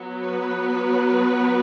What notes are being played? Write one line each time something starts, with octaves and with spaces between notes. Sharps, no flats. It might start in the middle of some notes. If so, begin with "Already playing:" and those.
Already playing: F#3 B3
B4